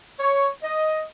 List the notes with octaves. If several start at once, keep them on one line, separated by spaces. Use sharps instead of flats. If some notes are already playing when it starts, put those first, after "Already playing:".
C#5
D#5